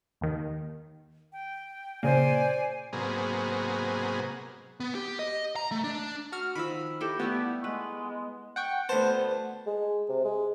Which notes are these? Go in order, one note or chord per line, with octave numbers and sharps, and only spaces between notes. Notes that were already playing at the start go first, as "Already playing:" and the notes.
D#2 D#3
G5
A#2 C#3 A#3 C5 D5 G#5
G#2 C3 F#3 A#3 B3 G#4
B3
G4
D#5
A#5
A3
D4
F#4 F6
D#3 F3 B5 E6
E4 G4 A4 A#4
G3 A3 B3 E4 G4
G#3 B4
F#5 G5 C#6
D2 B3 C5 A5
G#3
C3
G#3